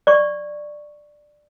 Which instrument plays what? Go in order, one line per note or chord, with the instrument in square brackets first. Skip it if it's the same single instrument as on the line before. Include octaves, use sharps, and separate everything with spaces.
[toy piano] D5 C#6